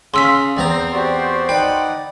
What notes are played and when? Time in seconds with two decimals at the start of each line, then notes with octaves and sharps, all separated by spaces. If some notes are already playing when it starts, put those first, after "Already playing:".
0.14 C#3 F5 C6 E6 B6
0.57 E2 C4 C5 A#5
0.93 F#4 G4 D5
1.49 D#4 B4 D5 F#5 G5